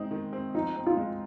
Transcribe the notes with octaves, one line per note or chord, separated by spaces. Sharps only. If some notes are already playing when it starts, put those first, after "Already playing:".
Already playing: G#3 C4 D#4
D#3
C4
F3 D#4
C4
F4
G#3